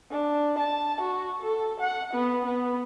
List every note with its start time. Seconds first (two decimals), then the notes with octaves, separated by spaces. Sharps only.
0.11 D4
0.58 A5
1.01 F#4
1.42 A4
1.80 F#5
2.14 B3
2.46 B3